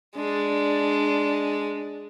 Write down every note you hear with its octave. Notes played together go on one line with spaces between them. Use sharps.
G#3 D4 D5